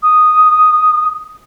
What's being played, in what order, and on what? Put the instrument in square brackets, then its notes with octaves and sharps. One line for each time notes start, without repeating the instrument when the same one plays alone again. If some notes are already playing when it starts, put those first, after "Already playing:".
[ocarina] D#6